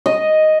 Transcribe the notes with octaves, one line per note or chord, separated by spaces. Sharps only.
D#5